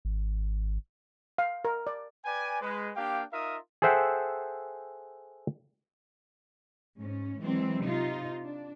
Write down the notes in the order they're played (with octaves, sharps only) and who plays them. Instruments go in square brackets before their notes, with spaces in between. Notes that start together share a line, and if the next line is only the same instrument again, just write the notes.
[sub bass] G#1
[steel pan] F5
A#4
D5
[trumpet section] B4 D5 G5 G#5
G#3 B4
A#3 D4 G4 F5 G5
D#4 F4 A#4 E5 F5 D#6
[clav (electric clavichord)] G#4 A4 C5 E5 F#5 G5
[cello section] G#2 C#4
E3 F#3 G#3 C4
C3 D#4 F4
D4